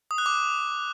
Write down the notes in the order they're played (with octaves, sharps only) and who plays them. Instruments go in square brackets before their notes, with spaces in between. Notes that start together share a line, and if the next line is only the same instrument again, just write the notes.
[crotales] D#6
F#6
D6